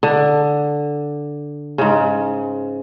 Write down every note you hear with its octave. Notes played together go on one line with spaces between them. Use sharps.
D3
G#2 C#3